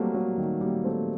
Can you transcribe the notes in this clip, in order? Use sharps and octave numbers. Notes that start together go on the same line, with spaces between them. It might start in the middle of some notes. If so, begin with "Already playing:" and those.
Already playing: F#3 G3 A3 A#3 C4
F#3 A3
D#3 G3
G3 A#3
A3 C4